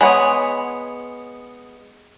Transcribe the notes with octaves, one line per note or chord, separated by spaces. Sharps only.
G#3 B3 C#5 G#5